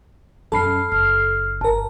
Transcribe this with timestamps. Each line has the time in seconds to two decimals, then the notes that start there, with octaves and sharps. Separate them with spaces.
0.52 F#2 C#4 A4 A5 B5 F6 C7
0.92 F#1 F6
1.61 G1 A#4 A5